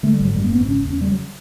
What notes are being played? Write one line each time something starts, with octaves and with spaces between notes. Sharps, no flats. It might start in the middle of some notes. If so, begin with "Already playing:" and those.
D3 A3
G3
G#1
F#3
F#2 G3
A#3
G#1 B3
C4
C#3 C#4
E2
C#4
C#3 G3
F#3